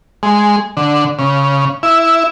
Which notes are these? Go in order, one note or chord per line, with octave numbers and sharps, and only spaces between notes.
G#3
D3
C#3
E4